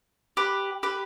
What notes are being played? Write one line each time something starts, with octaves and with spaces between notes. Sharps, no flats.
G4 B4
G4 B4